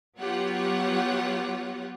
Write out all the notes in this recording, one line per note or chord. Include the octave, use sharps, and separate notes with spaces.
F#3 B3 F4 G4 C#5 F#5